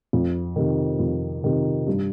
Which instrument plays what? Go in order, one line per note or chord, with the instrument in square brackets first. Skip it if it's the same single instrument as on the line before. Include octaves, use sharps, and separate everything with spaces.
[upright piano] F2
C3 D#3
F2
C3 D#3
G2